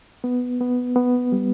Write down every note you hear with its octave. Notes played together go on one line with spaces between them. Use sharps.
B3
B3
B3
G3